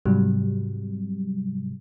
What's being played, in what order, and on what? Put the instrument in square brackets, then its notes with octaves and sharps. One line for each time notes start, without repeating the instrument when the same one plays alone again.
[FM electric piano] G#2 C3 F#3 G3